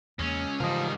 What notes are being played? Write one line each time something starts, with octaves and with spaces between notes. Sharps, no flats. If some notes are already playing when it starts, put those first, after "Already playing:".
E2 C#3 G#3 A#3 C#4
G#2 C#3 E3 F3 G3 A#4 D#5